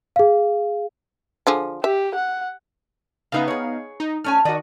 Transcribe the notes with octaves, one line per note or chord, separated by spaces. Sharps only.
G#4 F5
D3 F3 G#4
G4 E5
F#5
C#3 B3 D#4 B4 E5 F5
G#4 C#5
D#4
A3 C#4 G#5 F6
D#3 F#4 D5 D#5